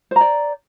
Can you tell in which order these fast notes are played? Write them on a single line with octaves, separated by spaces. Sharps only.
C5 A#5 D5